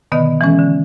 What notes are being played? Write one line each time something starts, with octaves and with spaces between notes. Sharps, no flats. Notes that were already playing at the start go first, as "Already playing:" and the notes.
B2 D3 D#3 B3 D#5
E3 G#3 C#4 A4
D3